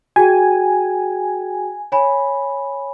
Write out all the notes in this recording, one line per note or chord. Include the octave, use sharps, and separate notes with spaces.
F#4 G#4 G5 G#5
C#5 G#5 B5